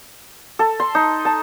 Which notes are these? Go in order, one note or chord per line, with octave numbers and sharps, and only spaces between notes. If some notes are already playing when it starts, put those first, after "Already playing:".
A4
C6
D#4
A5